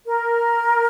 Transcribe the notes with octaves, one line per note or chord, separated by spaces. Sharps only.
A#4